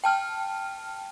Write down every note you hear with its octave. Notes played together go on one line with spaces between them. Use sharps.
G5 A5 F6